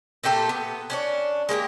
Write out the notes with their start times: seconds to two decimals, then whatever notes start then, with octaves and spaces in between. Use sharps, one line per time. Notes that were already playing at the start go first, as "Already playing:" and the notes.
0.24 A#2 A3 G4 A4
0.49 B3
0.90 C#4 D4 C#5
1.49 G#3 A#3 F#4 G4